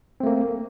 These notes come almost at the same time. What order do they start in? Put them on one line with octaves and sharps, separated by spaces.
C4 A3 A#3